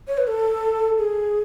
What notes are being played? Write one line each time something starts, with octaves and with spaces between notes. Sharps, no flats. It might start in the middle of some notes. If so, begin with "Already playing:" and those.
C#5
B4
A4
G#4